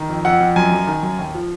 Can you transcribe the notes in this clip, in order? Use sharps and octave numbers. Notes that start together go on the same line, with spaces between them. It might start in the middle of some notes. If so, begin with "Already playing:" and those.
Already playing: D#3
F2
F2 F#5
F2
F#2 G#5
F#2
D#3
F#2
D#2
F3